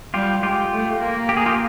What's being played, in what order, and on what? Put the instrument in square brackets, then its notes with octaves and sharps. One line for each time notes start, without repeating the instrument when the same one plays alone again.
[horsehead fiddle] G3 [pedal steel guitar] F4 G4
[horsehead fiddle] G#3 [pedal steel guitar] F4 G4
[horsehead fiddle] A3
A#3
[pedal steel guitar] G4
G#4
F4 G4